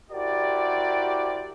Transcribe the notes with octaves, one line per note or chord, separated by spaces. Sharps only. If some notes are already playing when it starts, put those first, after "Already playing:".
E4 F#4 G4 A#4 C5 D5